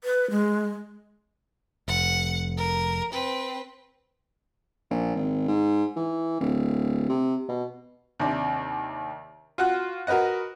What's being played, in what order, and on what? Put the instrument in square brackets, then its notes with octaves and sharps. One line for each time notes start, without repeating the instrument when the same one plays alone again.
[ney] B4
G#3
[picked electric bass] F1 [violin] F#5
[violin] A#4
C4 B4
[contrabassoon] A#1
G#1
G#2
E3
D1
C3
B2
[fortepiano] D#2 C3 D4
F4 F#4 F#5 F#6
F#4 A#4 B4 D#5 F#5